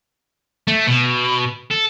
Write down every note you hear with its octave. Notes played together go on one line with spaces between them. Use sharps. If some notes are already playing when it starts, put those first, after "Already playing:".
A3
B2
A4